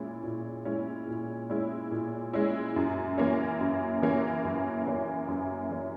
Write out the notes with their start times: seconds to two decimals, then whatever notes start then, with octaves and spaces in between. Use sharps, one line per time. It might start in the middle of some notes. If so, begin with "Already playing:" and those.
Already playing: A#2 G#3 C#4 E4
0.23 A#2
0.65 G#3 C#4 E4
1.07 A#2
1.50 G#3 C#4 E4
1.91 A#2
2.33 G#3 C#4 E4
2.76 F#2
3.18 E3 A#3 C#4
3.61 F#2
4.03 E3 A#3 C#4
4.45 F#2
4.86 E3 A#3 C#4
5.28 F#2
5.70 E3 A#3 C#4